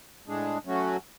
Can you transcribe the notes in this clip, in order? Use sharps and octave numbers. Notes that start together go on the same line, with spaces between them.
A2 G#3 D4 G#4
F#3 A3 C#4 F#4